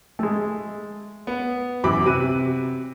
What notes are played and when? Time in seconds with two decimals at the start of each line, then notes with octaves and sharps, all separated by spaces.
0.19 G#3 A3
1.27 B3
1.84 F#2 B2 E3 B5 D6
2.05 C3 F#3 F#6 D#7